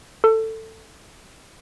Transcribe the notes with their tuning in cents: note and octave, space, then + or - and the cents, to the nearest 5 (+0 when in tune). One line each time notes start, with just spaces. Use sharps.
A4 +15